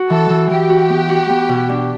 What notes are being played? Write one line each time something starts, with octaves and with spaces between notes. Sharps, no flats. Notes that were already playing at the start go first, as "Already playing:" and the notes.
Already playing: F#4
E3 A4
E3
E3 G4
F#4
B3
F#4
B3
B2
D4